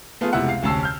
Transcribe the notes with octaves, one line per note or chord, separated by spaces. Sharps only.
A3 B3 F4 G#4
F1 C#2 C3 E4 E5 F#5
F5
F1 D2 C#4 A5 E6 C7
F6 G6